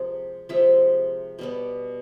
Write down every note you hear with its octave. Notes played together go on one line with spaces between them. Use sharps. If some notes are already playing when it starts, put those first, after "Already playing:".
Already playing: C3 F3 G#3
C3 F3 G#3 E5
B2 G3 B3